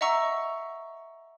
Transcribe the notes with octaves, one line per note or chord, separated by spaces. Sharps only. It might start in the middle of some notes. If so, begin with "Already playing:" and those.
D#5 E5 F#5 A#5 C#6 E6